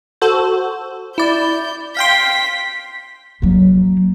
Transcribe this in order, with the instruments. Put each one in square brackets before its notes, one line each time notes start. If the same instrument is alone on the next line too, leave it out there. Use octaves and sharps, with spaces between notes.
[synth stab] F#4 A4 C5
[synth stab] E4 D5 [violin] G6
[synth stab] F5 G5 C6 [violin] B6
[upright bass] F#3 A#3